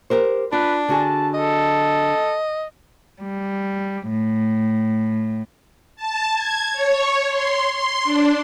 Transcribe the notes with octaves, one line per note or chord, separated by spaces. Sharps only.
G4 A#4 C5
D4 F4 B4
D3 F#4 G#4 A5
A4 D#5
G3
A2
A5
G#6
C#5
C6
C6
D4